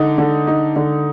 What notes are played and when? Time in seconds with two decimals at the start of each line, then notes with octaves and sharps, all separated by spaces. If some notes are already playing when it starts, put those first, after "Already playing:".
Already playing: D3 D#4
0.18 D3
0.47 D#4
0.76 D3